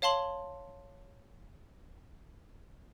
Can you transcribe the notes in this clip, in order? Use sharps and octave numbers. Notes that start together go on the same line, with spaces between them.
C#5 F5 A5 C6 F#7